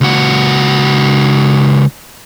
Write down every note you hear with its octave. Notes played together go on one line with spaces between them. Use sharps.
C#2 F#4